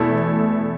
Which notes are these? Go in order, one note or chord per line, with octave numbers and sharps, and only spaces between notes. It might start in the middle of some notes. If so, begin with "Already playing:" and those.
Already playing: E2 B2 A3 E4